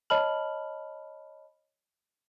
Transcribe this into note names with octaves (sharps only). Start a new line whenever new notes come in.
C#5 D#5 A5 B5 F6 F#7